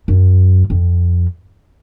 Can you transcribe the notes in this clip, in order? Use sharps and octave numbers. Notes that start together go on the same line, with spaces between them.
F#2
F2